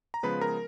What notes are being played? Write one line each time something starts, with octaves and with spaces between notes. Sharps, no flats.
A#5
C#3 F3 G#3 B3 B4 B5
A#4 A#5